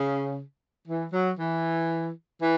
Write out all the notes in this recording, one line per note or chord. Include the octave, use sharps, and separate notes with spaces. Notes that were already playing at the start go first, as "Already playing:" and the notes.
Already playing: C#3
E3
F#3
E3
E3